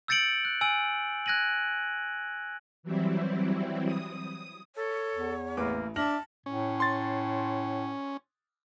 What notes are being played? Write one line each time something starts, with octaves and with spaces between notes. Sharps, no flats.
E6 G6 A6 C#7 D7 F#7
F#6
G#5 E6 D7 F#7
F#6 G#6 A#6 D#7 F#7
E3 F#3 G3 C4 E4
D#6
A4 C#5
E2
A1 A#3 B4 D6
D4 E5 A5 F6 A#6 F#7
A2 C#4
C6 A6